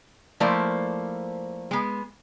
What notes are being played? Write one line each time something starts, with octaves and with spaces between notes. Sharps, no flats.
F3 A3 A#3 E4 C5 D5
G#3 B3